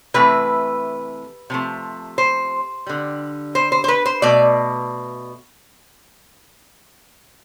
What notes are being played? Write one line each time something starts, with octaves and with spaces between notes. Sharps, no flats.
C3 E3 A3 B4
C3 F3 A3
C5
D3 G3
C5
C5
C5
B4
C5
B2 A3 D5